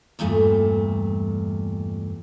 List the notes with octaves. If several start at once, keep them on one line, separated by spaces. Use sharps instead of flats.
E2 G2 A#2 A3